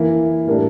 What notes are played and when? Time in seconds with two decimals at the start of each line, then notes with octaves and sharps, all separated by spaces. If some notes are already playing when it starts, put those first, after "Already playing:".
Already playing: E3 A#3 E4
0.47 A2 G3 A#3 D4 A4